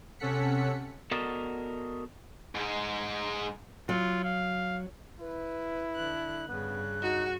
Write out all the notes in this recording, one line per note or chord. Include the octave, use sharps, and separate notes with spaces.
C3 C#4 A4 F#5 B6 C#7
B3 F#4 A4 A#4 D5 D#5
G#2 G#3
F#3 F4
F5
E4 B4
D3 F#6
G2 C#3 B3 F#6
D#4 F#4